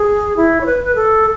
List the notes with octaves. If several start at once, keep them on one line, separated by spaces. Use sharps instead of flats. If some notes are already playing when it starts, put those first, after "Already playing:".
Already playing: G#4
E4
C#5
B4
B4
A4